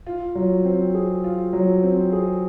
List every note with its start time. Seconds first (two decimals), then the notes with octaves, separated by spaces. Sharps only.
0.06 F4
0.35 F#3
0.65 C4
0.94 G#4
1.24 F4
1.53 F#3
1.83 C4
2.12 G#4